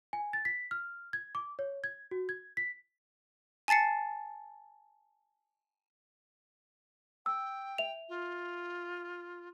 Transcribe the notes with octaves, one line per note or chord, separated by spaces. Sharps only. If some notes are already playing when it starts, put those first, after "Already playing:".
G#5
A6
B6
F6
G#6
D6
C#5
G#6
F#4
G#6
B6
G#5 A5 A6 C7 C#7
G5 E6
E5 F7
F4